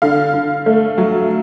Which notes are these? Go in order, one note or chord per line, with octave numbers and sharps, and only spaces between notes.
D3 F5
D3
A3
F#3